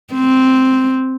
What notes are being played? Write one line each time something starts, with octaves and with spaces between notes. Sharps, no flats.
C4